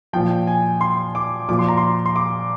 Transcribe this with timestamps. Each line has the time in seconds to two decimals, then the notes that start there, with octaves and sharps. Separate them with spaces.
0.13 A#2 F3 G5
0.47 G#5
0.81 C6
1.15 D6
1.49 A#2 F3 D6
1.59 C6
1.68 A#5
1.77 C6
2.06 C6
2.16 D6